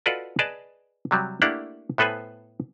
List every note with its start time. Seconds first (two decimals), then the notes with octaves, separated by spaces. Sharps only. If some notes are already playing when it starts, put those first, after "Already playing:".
0.06 F4 F#4 A4 B4 D5 D#5
0.39 G#4 B4 D5 D#5 A5
1.11 C3 F#3 G3
1.42 A3 A#3 D4 E4 G4 F#5
1.98 A2 B3 A4 B4 C5 G#5